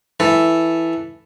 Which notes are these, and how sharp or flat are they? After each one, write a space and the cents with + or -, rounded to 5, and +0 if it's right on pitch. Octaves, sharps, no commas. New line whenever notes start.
E3 +0 A4 +0